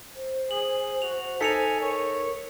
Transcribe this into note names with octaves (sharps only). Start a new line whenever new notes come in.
C5
G#4 F#7
F#4 F7
D#4 A4 G#5 B6 C#7 F7
A#4 C#5